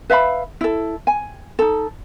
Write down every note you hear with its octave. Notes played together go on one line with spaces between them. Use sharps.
B4 E5 F5 B5
E4 A4
G#5
D#4 A4